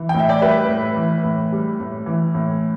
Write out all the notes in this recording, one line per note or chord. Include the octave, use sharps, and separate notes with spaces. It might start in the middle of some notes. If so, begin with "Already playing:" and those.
Already playing: E3
G5
A2
E5
D5 G5
G3 B4 E5
A2
E3
A2
G3
A2
E3
A2